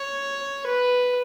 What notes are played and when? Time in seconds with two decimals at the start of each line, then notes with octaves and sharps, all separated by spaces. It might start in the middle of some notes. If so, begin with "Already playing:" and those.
Already playing: C#5
0.66 B4